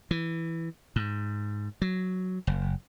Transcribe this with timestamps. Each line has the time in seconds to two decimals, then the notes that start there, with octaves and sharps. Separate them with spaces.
0.11 E3
0.96 G#2
1.82 F#3
2.47 F#1